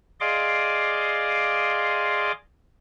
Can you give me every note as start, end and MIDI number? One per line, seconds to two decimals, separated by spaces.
0.20 2.32 68
0.20 2.32 74
0.20 2.32 75
0.20 2.32 77
0.20 2.32 84
0.20 2.32 86